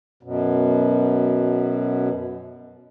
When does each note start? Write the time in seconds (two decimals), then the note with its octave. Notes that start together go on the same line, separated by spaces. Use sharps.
0.23 F#2 B2